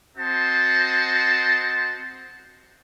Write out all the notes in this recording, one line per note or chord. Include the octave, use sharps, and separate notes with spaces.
C4 F#4 C5 D#5 A5